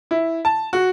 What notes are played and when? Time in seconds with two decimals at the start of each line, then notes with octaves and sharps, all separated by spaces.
0.11 E4
0.45 A5
0.73 F#4